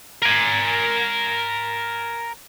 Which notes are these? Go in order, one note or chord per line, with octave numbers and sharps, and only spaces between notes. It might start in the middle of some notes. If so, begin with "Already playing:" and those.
A#4 G#5